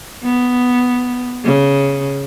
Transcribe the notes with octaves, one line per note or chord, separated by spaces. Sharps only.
B3
C#3